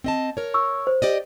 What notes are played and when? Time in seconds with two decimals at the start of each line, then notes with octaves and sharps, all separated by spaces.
0.04 C4 D#5 A5
0.37 A#4 C#5
0.54 C#6 E6
0.87 C5
1.02 G4 D5 D#5